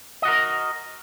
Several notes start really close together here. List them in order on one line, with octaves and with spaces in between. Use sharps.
D#5 F#4 A#4